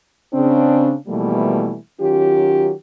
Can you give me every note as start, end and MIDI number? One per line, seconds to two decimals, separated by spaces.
0.34 0.95 49
0.34 0.95 60
0.34 0.95 62
1.08 1.77 47
1.08 1.77 52
1.08 1.77 53
1.08 1.77 55
1.08 1.77 57
1.08 1.77 58
2.01 2.72 51
2.01 2.72 54
2.01 2.72 61
2.01 2.72 65
2.01 2.72 67